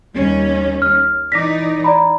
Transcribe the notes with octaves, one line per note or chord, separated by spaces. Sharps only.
D#2 G3 C#4
F6
E3 D#4 D5 D6 A#6 B6
D5 A#5 B5